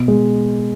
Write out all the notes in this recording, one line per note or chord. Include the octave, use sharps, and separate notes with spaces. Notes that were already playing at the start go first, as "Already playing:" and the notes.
Already playing: B2
G#3